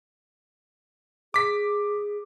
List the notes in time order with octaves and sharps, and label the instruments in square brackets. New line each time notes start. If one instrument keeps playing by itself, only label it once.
[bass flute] G#4 [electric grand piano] D6 B6